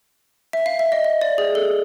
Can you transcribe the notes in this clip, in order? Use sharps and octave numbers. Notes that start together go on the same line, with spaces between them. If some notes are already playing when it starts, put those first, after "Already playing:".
E5
F5
E5
D#5
D#5
D5
G#4
A4